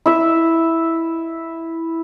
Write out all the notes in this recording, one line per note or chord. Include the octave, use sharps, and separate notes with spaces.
E4 E5